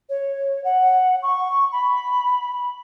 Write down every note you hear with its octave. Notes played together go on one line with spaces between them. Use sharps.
C#5
F#5
C#6
B5